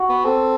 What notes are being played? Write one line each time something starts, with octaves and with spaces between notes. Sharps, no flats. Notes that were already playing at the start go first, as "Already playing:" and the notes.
Already playing: F#4
B3
C4 A4